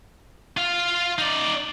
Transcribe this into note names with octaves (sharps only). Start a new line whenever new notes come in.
F4 F5
D#4 D5